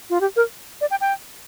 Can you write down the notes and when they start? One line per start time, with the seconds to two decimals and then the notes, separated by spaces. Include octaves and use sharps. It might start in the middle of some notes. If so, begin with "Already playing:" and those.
0.10 F4
0.21 G4
0.36 A#4
0.81 D5
0.91 G5
1.01 G5